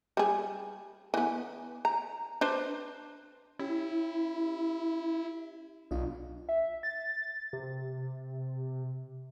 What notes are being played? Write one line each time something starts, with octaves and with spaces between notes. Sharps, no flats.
G3 G#4
E3 B3
A#5
D4 B4 C5
C#4 E4 G4
B1 D4 F4 D#5
E5
A6
C3